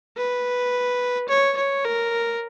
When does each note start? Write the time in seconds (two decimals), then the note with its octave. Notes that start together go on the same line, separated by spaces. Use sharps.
0.17 B4
1.29 C#5
1.57 C#5
1.85 A#4